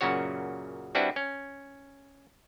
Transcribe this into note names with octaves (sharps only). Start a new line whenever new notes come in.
F#2 A#2 C#3 F#4 C#5
G3 C4 D4 E4 F#4 B4
C#4